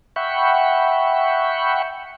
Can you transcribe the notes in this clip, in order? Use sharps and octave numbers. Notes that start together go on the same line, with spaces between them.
E5 F#5 G5 B5 C#6